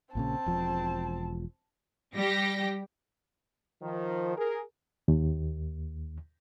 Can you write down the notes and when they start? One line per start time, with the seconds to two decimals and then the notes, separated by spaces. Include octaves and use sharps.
0.15 A#1 A#2 C#3 C4 A5
0.46 E1 F3
2.14 G3 G4 A#6
3.82 D#3 F3
4.37 G#4 A#4
5.08 D#2